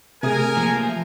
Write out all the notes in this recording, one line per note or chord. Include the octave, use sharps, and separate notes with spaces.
C3 A3 G#4 A#4 G#5 D#6
F3 A#3